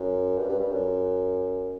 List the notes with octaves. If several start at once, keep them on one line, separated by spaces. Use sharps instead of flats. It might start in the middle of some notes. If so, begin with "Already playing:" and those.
Already playing: F#2
G2
G2
G2
F#2